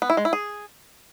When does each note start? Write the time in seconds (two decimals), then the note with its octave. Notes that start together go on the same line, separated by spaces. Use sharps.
0.02 B3
0.10 E4
0.17 G#3
0.25 E4
0.33 G#4